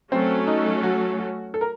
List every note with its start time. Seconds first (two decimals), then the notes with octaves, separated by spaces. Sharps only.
0.12 F#3 A3 C4 C#4 A4
0.47 D#4
0.83 F#4
1.19 F#4
1.54 A4
1.61 A#4